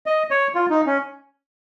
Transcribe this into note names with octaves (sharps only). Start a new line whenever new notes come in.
D#5
C#5
F4
D#4
C#4